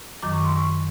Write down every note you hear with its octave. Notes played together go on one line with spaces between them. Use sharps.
F#2 D#3 F#3 D6
C#6
C6
C#6